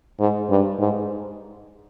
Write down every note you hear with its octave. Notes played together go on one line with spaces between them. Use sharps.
G#2
G2
G#2